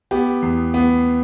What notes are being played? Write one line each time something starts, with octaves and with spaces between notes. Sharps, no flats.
B3 G4
E2
B3